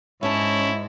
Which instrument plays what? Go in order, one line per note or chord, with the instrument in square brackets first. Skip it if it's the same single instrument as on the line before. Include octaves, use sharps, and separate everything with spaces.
[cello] G#2 [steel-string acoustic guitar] C#4 A5 [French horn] E4 [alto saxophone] C#5